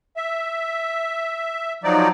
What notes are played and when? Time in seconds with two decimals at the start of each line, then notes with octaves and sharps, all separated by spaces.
0.17 E5
1.84 F3 F#3 D#4 D5